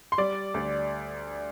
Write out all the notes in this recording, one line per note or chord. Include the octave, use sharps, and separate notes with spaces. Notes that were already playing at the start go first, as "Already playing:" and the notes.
C6
G3 D5 D6
D2